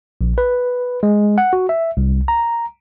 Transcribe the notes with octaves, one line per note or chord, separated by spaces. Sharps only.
A#1
B4
G#3
F#5
F#4
E5
C2
A#5